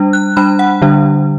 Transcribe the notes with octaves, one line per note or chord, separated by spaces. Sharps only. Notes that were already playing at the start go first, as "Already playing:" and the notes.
Already playing: G3 D4
F#6
G3 D4 B5
F#5
D3 G3 D4